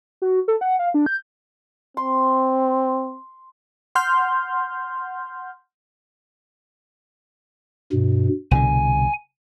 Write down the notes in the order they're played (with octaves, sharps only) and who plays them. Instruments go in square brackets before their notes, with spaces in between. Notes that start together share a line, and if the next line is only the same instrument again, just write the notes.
[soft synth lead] F#4
A4
F#5
F5
D4
G6
[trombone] C4 [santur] C6
[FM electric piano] F#5 C6 F6 G6
[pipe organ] G2 B2
[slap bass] C2 B2 D3 [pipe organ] G#5